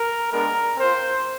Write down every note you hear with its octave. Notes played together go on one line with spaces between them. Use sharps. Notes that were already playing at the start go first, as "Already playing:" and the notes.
Already playing: A#4
G#3 B3 D4 A#4
C4 F4 C5